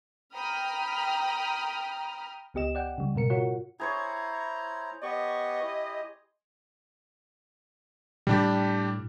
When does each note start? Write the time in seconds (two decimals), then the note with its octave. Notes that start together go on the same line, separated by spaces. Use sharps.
0.34 G5 A#5 B5 D#6 F6
2.54 C#2 B3 G4 D#5 E7
2.75 D5 F#5 G5
2.98 C#3 G3
3.15 G#2 B2 A#4 C#7
3.30 F4 F#4 A#4 C#5 F#5
3.80 E4 G#4 C5 C#5 A#5
5.03 B3 G4 D#5 C#6
5.62 E4 G4
8.27 A2 G3 D4 G4